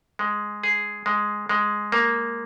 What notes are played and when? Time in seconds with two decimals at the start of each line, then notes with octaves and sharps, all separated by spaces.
0.19 G#3
0.64 G#4
1.06 G#3
1.49 G#3
1.92 A#3